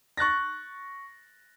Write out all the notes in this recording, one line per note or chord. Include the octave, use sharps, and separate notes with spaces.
C#6 F#6 A6 A#6